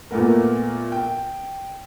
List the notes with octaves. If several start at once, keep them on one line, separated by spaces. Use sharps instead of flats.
A#2 A3 B3 A#4
G5